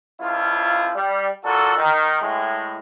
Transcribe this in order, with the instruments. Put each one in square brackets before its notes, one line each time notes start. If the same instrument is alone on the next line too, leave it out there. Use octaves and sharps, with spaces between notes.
[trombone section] C#2 F3 E4 F4
G3
A#2 F#4 A4
D#3
A2 G#3